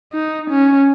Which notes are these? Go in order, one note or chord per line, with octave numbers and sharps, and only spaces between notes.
D#4
C#4